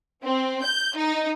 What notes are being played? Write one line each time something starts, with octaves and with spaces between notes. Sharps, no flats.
C4
G6
D#4